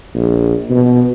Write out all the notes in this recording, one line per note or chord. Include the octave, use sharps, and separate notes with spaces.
A#1
B2